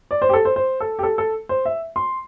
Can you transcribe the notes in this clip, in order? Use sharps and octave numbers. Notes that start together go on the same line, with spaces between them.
D5
C5
G4
A4
C5
C5
A4
G4
A4
A4
C5
E5
C6